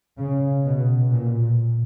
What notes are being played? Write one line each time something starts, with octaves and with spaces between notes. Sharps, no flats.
C#3
B2
A#2